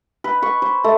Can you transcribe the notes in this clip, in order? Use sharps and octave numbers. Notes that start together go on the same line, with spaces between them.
B4
C#6
C5
A3